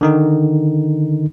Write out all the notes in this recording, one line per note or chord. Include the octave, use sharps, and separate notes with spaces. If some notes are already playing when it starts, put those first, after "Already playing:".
D3 D#3 D#4